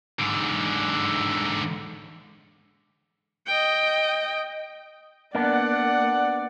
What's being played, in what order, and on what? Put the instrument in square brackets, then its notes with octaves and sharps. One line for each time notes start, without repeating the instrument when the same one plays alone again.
[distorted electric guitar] G#2 D3
[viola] D#5 G5
[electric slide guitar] A#3 [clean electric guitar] B3 D4 [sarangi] D5 [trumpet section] F#5